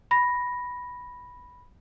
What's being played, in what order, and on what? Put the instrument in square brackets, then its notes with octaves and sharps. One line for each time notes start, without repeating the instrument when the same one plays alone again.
[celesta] B5 A#6